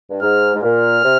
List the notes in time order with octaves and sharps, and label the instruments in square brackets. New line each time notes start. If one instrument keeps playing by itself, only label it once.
[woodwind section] G2
[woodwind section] G#2 [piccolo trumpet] F6
[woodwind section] G#2
[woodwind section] A#2 [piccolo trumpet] F6
[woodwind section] C3